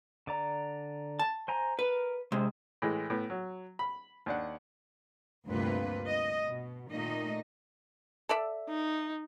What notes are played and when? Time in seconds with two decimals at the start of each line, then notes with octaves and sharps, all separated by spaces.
0.27 D3 D5 A#5
1.19 A5
1.48 C5 G#5 A#5
1.79 A#4 B4
2.32 C3 G#3 C5
2.82 A2 E3 G#3
3.10 A2 B3
3.30 F#3
3.79 B5
4.26 D#2 D4 F#5
5.47 D2 G2 C3 A#3 F4 B4
6.07 D#5
6.46 B2
6.91 A#2 D#3 A3 D#4 D#5
8.29 A4 D5 E5
8.69 D#4